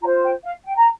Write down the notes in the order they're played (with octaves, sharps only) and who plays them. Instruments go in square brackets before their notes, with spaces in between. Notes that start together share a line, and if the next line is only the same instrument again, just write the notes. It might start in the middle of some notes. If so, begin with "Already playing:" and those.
[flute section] F4 A#5
C5
G5
F5
G5
A#5